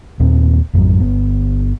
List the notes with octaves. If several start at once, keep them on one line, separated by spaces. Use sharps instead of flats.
D#2 A#2 A#3 C4
A1 F2 G#2 F#3
G1 B3